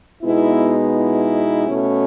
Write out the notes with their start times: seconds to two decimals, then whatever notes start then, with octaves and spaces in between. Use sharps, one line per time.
0.23 B2 G#3 B3 D#4 E4
0.95 E4
1.67 B2 A3 C#4